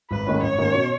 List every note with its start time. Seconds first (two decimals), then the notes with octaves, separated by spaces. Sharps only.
0.10 G#1 B4
0.27 G#2 D#3 A#3 C#4
0.43 G#1 C#5
0.58 G#2 D#3 A#3 C#4
0.74 B2